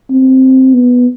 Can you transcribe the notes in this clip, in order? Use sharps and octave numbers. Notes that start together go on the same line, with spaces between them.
C4
B3